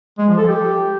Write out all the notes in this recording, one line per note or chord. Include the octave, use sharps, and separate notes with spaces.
G#3
F3
A4
G4